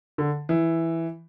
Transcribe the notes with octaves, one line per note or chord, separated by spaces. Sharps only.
D3
E3